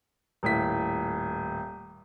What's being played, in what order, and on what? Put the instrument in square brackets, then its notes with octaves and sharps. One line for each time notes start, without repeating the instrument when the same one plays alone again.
[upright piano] D#1 A2 B6